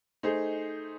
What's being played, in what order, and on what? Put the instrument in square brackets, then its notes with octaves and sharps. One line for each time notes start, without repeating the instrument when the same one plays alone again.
[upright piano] A3 D#4 G#4 C5